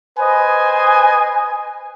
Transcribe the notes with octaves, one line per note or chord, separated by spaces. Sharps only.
B4 C5 D#5 G#5